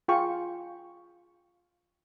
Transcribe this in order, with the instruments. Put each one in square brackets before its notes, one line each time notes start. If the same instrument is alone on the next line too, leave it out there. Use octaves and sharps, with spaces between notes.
[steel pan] F4 G#4 G5 C#6